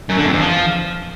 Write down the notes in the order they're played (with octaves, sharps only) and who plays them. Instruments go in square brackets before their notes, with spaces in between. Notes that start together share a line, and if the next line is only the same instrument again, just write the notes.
[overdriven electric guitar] F#2
D3
F2
E2
F3